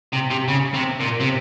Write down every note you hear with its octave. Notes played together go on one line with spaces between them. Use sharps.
C3
C3
C#3
C3
A#2
C3